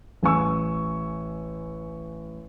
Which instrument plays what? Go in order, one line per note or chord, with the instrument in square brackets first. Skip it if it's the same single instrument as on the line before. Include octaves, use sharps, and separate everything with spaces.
[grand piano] A1 G#5 C#6 E6